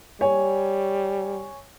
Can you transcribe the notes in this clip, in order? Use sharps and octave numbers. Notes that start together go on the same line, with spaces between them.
G3 C#5 G#5